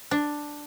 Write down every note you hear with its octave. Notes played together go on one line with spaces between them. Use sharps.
D4